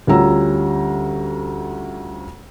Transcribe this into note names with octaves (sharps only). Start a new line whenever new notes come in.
D2 G3 C#4 F4 A#5 E6